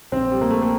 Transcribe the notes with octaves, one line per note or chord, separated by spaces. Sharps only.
A#1 C4
G3
A#1 A#3
A3
A#3